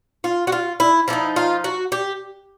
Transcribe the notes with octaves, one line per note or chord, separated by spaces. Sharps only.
F4
F#4
F4
E4
F3 A#3 E4
D#4
F4
F#4
G4